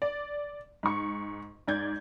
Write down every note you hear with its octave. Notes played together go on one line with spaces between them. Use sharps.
D5
G#2 C#6
G#2 D5 G6 G#6